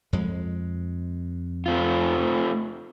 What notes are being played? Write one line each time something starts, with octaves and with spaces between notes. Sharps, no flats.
F2 G#3
A3 C4 F4